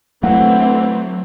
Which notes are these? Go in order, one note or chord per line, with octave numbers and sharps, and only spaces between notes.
D3 E3 F#3 A3 C4 F#5